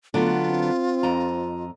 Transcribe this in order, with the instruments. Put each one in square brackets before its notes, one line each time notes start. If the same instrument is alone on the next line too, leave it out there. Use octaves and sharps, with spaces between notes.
[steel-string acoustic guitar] D3 F#3 B3 [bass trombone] A3 [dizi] F4
[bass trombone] C4
[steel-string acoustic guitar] F2 D#5 A#5